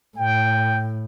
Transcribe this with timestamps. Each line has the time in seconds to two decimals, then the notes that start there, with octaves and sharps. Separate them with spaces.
0.17 A2 G5